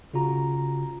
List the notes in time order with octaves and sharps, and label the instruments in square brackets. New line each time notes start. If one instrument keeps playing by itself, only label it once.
[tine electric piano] C#3 F4 F#4 A#5